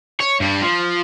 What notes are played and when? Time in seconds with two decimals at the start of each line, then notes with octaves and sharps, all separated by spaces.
0.20 C#5
0.41 G2 G3
0.62 F3